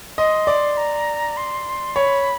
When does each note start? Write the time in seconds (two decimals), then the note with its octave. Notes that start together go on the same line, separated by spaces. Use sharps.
0.18 D#5 C6
0.47 D5
0.77 A#5
1.37 C6
1.95 C#5 B5